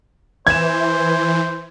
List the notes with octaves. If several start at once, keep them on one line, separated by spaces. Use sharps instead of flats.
E3 C5 G#6 E7